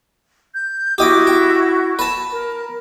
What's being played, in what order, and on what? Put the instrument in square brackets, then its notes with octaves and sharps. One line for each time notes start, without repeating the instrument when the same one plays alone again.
[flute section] G6
[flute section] E4 F#4 [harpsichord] G4 D#5 D6
[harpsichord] G5
B4 A5
[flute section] A#4